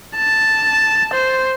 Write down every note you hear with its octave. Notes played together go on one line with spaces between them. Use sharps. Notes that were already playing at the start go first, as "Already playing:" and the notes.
A5
C5